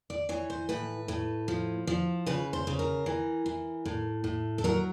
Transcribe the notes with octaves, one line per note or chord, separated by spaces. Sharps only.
D5
E3 C#5
C5
A2 B4
A2
F3
F3
C#3 B4
C5
C#3
A#4
E3
E3
A2
A2
A4
F#3 A#4